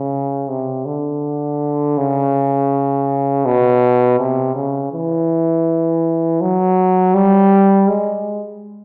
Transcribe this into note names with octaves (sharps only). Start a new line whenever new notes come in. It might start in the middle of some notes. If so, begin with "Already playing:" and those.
Already playing: C#3
C3
D3
C#3
B2
C3
C#3
E3
F#3
G3
G#3